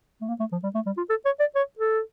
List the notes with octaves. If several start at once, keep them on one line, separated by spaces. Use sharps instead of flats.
A3
A#3
A3
F3
G3
A3
G3
F4
A4
C#5
D5
C#5
A4